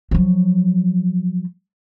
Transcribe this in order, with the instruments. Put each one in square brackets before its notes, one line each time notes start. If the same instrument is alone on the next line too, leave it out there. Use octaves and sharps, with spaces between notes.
[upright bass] F3 F#3